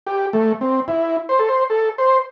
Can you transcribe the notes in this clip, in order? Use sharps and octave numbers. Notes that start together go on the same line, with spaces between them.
G4
A3
C4
E4
C5
A4
C5
A4
C5